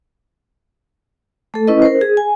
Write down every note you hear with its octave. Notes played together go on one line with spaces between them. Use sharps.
A3 A4
C#4 E4 B4 D#5
A#4 C5
G#4
G#5